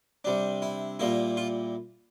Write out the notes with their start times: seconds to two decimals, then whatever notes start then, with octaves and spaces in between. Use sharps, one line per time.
0.24 C3 G3 D4
0.62 E4
0.99 A#2 G3 A#3 E4
1.37 F4